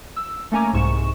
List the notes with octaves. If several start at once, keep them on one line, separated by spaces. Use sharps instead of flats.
E6
A3 A#3 C#4 G#5 A#5 D6
C2 G#2 C#6 E7